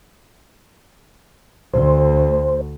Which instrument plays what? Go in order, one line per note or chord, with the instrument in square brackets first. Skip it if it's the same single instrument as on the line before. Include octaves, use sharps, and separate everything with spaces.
[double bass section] D2 [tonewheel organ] C5